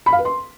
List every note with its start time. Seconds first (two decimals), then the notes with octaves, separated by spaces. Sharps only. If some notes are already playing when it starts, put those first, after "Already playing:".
0.06 B5
0.13 F5
0.19 B4
0.25 C6